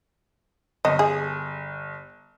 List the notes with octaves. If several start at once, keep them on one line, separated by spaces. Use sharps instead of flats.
G1 D#5
G#4